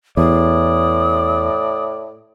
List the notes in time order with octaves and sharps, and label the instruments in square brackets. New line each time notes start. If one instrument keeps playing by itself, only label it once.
[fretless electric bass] E2 [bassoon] A2 [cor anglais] D5 [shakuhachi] D#6